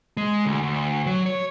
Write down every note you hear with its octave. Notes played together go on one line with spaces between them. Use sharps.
G#3
D2
D2
F#3
C#5